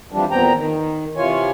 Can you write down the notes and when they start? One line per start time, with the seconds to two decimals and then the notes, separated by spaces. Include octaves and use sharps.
0.12 F2 E3 F3 G3 D4
0.31 E2 A#2 B3 C4 G5 A#5
0.55 D#3
1.17 C3 E3 F4 C#5 G#5